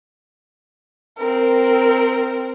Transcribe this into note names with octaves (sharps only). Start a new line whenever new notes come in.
C4 A#4